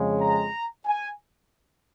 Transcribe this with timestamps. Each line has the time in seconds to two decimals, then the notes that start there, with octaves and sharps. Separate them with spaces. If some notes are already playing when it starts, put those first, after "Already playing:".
Already playing: F2 C#3 G#3
0.21 A#5
0.86 G#5